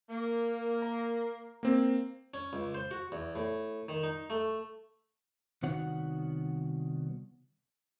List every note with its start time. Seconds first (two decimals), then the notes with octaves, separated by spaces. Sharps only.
0.09 A#3
0.82 A#5
1.63 A#3 C4
2.34 C#4
2.53 C#2
2.74 C5
2.91 F#4
3.12 E2
3.36 A2
3.89 D#3
4.03 D#4
4.30 A3
5.63 C2 D#3 B3 F#4 C#5 F#5